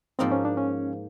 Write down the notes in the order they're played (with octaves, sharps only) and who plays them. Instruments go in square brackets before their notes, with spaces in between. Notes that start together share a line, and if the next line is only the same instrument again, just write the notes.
[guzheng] G#2 F3 A#3 D#4 [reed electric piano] C4
[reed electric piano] C#4
D4
C#4